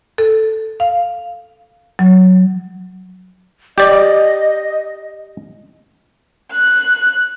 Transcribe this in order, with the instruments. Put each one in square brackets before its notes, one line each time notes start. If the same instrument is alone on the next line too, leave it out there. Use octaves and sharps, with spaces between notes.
[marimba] A4
F5
F#3
[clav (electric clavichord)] G4 D5 [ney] D#5
[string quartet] F#6